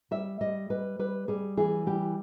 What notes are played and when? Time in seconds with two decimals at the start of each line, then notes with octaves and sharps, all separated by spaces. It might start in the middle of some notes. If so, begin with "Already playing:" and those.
0.11 G3 E5
0.41 G3 D#5
0.70 G3 B4
0.99 G3 B4
1.28 G3 G#4
1.57 E3 G#4
1.86 G3 G4